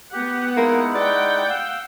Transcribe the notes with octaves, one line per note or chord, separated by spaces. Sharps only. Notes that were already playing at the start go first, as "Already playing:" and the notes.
B3 G4 F#5
G#3 A#3 D#4 E4
D5 F#5 G5
F5 E6